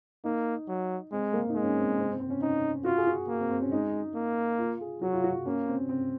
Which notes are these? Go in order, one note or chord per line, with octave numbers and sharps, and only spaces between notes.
A#3 D#4
F#3
G#3 C4
A#3
D#4
G#3
C#4
C4
C4
C4
C4
C#4
C#4 D#4
F4 F#4
G#4
F#4
A#3
C4
C4
C#4
G#3 D#4
A#3
F4
G#4
F#3 F#4
F4
F#4
F4
A#3 C#4
C4
C4